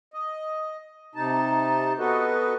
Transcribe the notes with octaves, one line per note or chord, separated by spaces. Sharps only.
D#5
C3 D#4 A5
B3 F#4 A4 B4 D#5